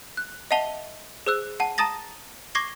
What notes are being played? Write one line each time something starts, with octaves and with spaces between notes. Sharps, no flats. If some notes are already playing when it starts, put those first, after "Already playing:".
F#6
D#5 E5 F#5 A5 F7 G7
G#4 C5 E6 F#6
F#5 A5
A5 A#5 D#6 A6 A#6
C#6 D6 G#6 A#6 C7 G7